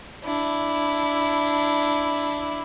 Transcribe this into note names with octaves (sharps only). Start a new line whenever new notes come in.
D4 E4